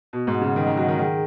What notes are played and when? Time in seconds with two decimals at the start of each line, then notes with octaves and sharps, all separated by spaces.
0.13 B2 F#4
0.27 G#2
0.35 F#5
0.42 C#3
0.56 D#3 D#5
0.67 D#3
0.77 F#3 F#5
0.88 D#3
0.99 D#3 G#4